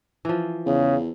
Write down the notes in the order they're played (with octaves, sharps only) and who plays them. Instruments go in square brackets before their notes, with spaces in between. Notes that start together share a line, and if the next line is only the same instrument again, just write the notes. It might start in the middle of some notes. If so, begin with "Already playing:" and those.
[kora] E3 F3
[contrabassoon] E2 [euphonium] C#3